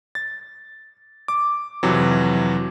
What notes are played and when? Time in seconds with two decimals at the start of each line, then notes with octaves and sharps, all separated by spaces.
0.15 A6
1.28 D6
1.83 F2 C3 E3 F#3